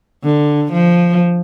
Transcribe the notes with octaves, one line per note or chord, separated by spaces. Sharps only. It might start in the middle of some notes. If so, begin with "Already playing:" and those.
D3
F3